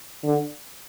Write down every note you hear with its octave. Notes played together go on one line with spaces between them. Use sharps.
D3